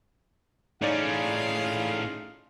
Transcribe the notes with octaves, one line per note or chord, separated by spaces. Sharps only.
A2 C#4 D#4 F4 G#4 C#5 D5 F5